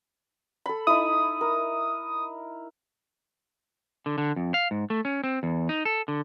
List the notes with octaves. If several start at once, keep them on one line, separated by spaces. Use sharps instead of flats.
A4 B5
D#4 E4 D#6
A#4
D3
D3
F2
F5
G#2
A3
C#4
C4
E2
D#4
A4
D3